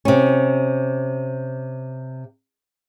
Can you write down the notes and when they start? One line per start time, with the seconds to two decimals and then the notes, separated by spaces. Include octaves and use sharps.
0.05 C3 C#4